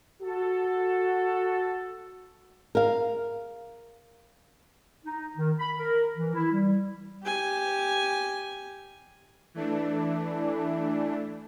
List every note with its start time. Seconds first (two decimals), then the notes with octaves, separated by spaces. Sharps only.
0.22 F#4 A4
2.75 A#4 F5
5.05 D#4
5.37 D#3
5.59 B5
5.78 A#4
6.16 E3
6.34 E4
6.52 G3
7.23 G4 G#5
9.54 E3 A3 D4